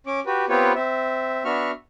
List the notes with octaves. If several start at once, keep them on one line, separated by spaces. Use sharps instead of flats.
C#4 D6
F#4 G4 B4
B3 C4 F4 G4 B4 C#5
C4 E5
B3 D4 F#4 E5 C#6 F6